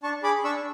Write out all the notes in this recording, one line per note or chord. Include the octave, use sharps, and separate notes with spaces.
D4 A5 C#6
G#4 B5 D6
D4 C#6 E6